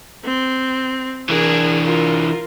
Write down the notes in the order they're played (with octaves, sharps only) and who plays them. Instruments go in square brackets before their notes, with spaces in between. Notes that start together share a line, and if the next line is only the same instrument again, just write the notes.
[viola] C4
[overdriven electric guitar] E3 D4 [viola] G#4 A#4
[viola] F4 A#4